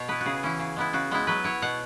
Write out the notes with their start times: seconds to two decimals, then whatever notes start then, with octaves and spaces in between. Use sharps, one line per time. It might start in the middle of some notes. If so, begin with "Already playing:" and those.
Already playing: B2 C#5
0.08 B3 E4 B4
0.21 F#4
0.26 C#3 G#4
0.43 E3 C#4 E4
0.59 C#3
0.76 G#3 B3 E4
0.93 C#3 F#4
1.11 G#3 B3 E4
1.27 F#3 B4
1.44 E4 C#5
1.62 B2 F#5